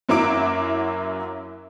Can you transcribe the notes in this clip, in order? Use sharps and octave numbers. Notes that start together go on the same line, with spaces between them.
F#2 F#3 A#3 E4 D6 D7